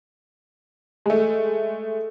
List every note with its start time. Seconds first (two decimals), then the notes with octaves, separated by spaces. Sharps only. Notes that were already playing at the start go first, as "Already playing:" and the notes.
1.06 G#3 A3